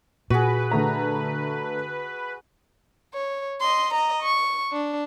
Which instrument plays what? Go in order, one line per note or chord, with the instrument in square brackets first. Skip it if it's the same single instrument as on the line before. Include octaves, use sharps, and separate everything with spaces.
[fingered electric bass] A#2 [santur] F#4 G#4 [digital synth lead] B4
[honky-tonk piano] D3 A3 A#5
[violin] C#5
D#5 C6
D#5 A#5
C#6
D4